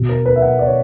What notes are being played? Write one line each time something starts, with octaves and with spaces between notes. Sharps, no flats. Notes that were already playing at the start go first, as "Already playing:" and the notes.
Already playing: B2
A#4
B4
E5
F#5
D5
C#5